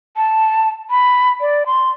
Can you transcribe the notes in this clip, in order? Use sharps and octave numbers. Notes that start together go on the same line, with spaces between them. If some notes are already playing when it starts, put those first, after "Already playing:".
A5
B5
D5
C6